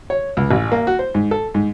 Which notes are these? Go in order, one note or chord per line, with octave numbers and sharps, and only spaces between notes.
C#5
C#2
A1
A#3
F#4
C5
G#2
A4
G#2